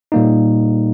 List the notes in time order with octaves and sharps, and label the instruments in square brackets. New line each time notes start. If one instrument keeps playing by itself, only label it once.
[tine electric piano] A#2 G3 A#3 D#4